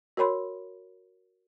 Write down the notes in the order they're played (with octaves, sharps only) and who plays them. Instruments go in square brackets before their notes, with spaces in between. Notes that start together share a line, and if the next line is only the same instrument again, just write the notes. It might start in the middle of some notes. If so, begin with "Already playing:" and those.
[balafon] F#4 A#4 C#5 B5 C6